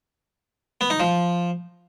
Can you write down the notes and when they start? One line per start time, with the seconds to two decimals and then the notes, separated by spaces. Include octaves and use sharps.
0.81 B3
0.90 D#4
1.00 F3